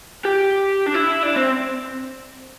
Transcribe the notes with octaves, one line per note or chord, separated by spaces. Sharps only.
G4
D4
E4
D4
C4